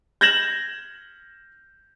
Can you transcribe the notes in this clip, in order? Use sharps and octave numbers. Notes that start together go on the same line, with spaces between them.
G6 G#6 A#6 E7 F#7